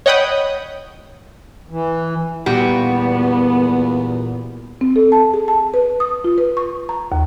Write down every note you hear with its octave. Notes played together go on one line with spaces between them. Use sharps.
C#5 D#5 F#5 G5 B5 D#6
E3
E2 A#2 G3 B3 F#4
C4
A4
A5
G#4
A5
B4
D#6
F4
B4
C#6
A#5
D#2